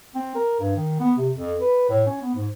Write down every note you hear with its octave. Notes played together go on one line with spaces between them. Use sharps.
C4
A#4
G2
D#3
B3
C3
F2
B4
A2
C#4
B3
G#2